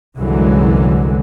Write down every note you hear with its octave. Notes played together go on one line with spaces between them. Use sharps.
C2 F#2 D3 E3 F#3 G#3